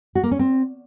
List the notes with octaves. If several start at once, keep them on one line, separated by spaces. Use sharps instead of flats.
F#4
A#3
C#4
C4